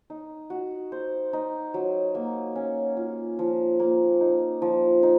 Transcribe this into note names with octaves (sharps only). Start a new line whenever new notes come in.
D#4
F#4
C5
D#4
F#3
A#3
C#4
F4
F3
A#3
D#4
F3
D#4